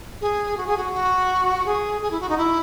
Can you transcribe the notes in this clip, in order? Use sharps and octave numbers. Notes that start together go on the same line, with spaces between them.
G#4
F#4
G#4
F#4
F#4
G#4
G#4
E4
F#4
D#4
E4